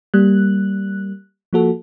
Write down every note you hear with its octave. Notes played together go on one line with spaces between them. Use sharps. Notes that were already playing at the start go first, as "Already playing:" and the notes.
G3 A#3 F#6
F3 A#3 F#4 A4